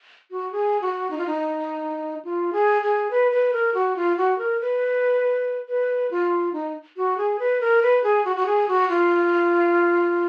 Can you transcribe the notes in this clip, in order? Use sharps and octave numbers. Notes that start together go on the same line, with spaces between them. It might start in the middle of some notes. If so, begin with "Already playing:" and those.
F#4
G#4
F#4
D#4
F4
D#4
F4
G#4
G#4
B4
B4
A#4
F#4
F4
F#4
A#4
B4
B4
F4
D#4
F#4
G#4
B4
A#4
B4
G#4
F#4
F#4
G#4
F#4
F4